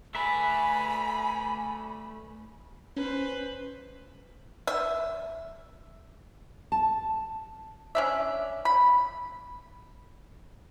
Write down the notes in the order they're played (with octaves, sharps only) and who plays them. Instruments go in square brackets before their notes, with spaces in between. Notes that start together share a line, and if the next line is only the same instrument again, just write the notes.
[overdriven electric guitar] A3 D5 [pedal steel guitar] B4 E5 [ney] G#5 [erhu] B5
[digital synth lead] C#4 [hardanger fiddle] B4 C5
[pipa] E5
[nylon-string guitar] A5
[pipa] C#4 D4 E5
B5